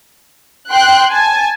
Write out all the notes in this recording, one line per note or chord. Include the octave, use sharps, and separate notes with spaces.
G5 C6 F#6
G#5 A5